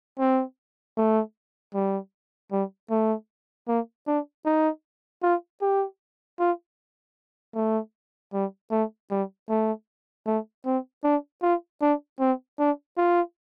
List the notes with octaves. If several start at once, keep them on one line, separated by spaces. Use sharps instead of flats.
C4
A3
G3
G3
A3
A#3
D4
D#4
F4
G4
F4
A3
G3
A3
G3
A3
A3
C4
D4
F4
D4
C4
D4
F4